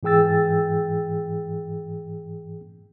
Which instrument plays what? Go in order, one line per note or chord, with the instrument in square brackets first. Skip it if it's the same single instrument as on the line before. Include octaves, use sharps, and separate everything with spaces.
[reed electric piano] G#2 E3 G#4 G5 E6 A6